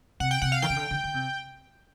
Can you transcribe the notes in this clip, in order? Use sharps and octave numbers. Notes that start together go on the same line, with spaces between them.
C3 F#5
G5
C3 F#5
F5
D#3 G5
C#3
D3
D3
D3
C3